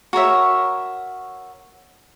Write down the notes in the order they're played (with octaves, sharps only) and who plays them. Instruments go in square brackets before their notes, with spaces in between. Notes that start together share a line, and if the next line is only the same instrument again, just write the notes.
[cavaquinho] F#4 A#4 C#5 E5